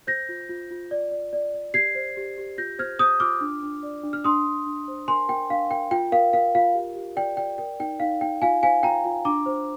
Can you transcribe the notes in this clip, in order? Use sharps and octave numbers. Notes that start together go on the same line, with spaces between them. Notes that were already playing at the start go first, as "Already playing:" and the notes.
C5 G6 A#6
F4
F4
F4
D5
D5
D5
D5
G4 G#6 C7
C5
G4
G4
F4 G6 A#6
C5 F6 G#6
C5 D#6 G6
F4 D6 F6
D4
D4
D5
D4
F6
D4 C6 D#6
D4
D4
C5
A#4 G#5 C6
A#4 G5
D4 F5
A#4 G5
F4 G5
A#4 F5
A#4 F5
F4 F5
G4
G4
D5 G5
D5 G5
A#4 G5
D#4 G5
D#4 F5
D#4 G5
F4 F5 G#5
C5 F5 G#5
F4 G5 A#5
F4
D4 A#5 D6
C5